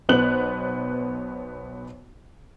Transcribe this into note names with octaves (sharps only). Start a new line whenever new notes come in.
B1 B3 B4 C5 F#6 F#7